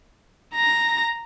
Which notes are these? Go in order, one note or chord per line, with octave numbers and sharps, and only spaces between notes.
A#5 A#6